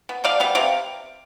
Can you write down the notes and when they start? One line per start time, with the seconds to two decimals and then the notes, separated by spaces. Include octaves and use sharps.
0.09 B3
0.24 B2 D5 F5
0.40 G3 B3 F5
0.55 C3 D5 F5